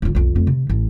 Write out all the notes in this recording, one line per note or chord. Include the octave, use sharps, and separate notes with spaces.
D1 F2
B1 F2
F2 A3
C3
A1